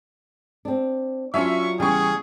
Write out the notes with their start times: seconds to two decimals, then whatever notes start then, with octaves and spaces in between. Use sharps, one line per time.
0.65 C4 D4
1.34 F#3 C#4 D4 F4 E5 C#6
1.80 E2 C#3 G3 G#4 G5 C#6